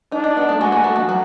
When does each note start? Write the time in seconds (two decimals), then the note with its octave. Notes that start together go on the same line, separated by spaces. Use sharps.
0.12 D4 D#4
0.24 D#4
0.37 B3
0.49 A3
0.60 G#3 F#4
0.72 A#3
0.84 A3
0.96 F3
1.09 F#3